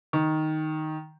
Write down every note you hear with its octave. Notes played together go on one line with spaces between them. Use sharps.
D#3